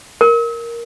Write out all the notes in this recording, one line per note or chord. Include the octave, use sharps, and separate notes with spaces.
A#4